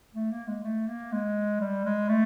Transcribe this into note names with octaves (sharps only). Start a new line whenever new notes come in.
A3
A#3
G#3
A3
A#3
G#3
G3
G#3
A3